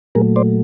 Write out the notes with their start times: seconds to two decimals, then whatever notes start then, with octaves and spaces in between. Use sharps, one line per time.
0.15 A#2 F#3 A3 G#4 A#4
0.36 C5 D5